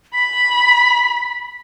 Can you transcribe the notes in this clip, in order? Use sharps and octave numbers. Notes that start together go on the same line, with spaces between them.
B5 B6